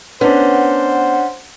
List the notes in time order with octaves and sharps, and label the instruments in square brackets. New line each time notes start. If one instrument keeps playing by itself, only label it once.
[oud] B3 [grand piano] C#4 D4 [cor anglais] C5 [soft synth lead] F#5